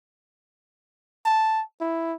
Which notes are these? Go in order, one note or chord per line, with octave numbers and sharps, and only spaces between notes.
A5
E4